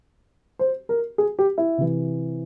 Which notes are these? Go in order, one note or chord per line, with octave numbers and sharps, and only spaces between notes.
C5
A#4
G#4
G4
E4
C3 E3